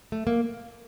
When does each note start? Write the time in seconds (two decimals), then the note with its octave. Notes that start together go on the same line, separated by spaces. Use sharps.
0.12 A3
0.27 A#3